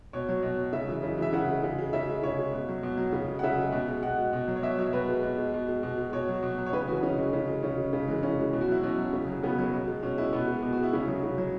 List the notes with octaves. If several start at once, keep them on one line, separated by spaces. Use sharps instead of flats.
B2 C#5
F#3
B2
F#3
C#3 E5
E3 G#3
C#3
E3 G#3 E5
C#3 F#5
G#3
C#3
G#3
C#3 E5
G#3
C#3 C#5
G#3
B2
F#3
B2
F#3
C#3
G#3
F#5
C#3 E5
G#3
B2
G#3
B2 F#5
G#3
B2
F#3
C#5
B2 E5
F#3 C#5
B2 B4
G#3
B2
G#3
B2
G#3
B2
G#3
B2 C#5
F#3
B2
F#3
C#5
C#3 B4
E3 G#3 F#4
C#3 C#4
E3 G#3
C#3
G#3
C#3 C#4
G#3
C#3
E3 G#3
C#3 C#4
E3 G#3
B2
F#4
F#3 E4
B2 C#4
F#3
C#3
F#3
C#3 B3
F#3
B2
G#3
B2 C#4
G#3 E4
B2 B3
G#3
B2
F#4
G#3
E4
C#3 C#4
F#3
C#3
F#3